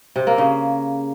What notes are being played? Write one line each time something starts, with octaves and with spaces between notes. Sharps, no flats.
C3
A#3
C#3